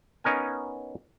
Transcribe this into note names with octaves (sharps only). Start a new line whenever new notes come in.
B3 C#4 D#4 A#4 G#5